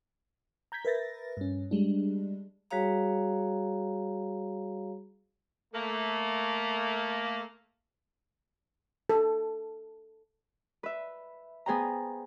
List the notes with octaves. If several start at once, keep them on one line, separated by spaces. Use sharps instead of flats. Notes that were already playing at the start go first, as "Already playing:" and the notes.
A#5 G6 G#6 B6
A#4 B4 E5 A6 A#6
G2 C#4
G3 G#3 D4
G3 F#4 G#4 C#5 F5 A#5
A3 A#3
A4
B4 E5
B3 G#4 C5 G5 A#5